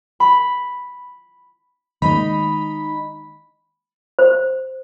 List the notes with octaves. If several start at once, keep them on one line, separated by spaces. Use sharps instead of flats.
B5
D#3 G#3 A#3 D#4 B5
C5